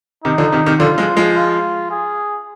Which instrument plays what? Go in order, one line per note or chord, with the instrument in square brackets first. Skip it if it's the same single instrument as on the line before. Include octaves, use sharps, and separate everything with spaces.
[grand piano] C3 D#3 [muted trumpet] D#4
[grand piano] D3 F3
C3 D#3
C3 D#3
[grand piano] D3 F3 [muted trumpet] F4
[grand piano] F3 G#3
F3 G#3
[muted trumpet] F4
G#4